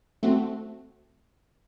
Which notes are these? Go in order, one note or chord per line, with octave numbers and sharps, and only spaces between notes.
A3 C4 F#4